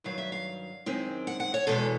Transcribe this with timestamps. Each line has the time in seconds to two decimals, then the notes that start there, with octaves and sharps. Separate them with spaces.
0.04 G2 D#3 F#3 F5
0.18 E5
0.32 F5
0.86 F#2 D#3 G#3 C4
1.27 F#5
1.40 F#5
1.54 C#5
1.67 E2 B2 G#3 A4